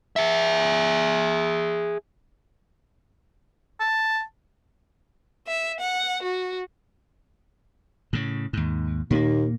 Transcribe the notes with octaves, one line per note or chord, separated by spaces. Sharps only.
G#4 E5
A5
E5
F#5
F#4
A2 C#3
D#2 G#2
D#2 A#2 A#3